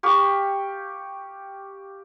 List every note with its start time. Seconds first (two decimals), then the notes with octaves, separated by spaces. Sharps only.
0.03 G4 F5 C#6